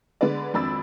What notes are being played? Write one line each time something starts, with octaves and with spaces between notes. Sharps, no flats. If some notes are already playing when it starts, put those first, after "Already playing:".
D3 G#3 B3 B4 D5
G#1 F2 D4 B5 E6 A6